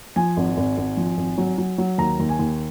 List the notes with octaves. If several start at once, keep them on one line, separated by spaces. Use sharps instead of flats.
F3 G#5
G#1
G#1
G#1
F3
G#1
F#3
F#3
F#3
D#2 A#5
D#2
G#5
D#2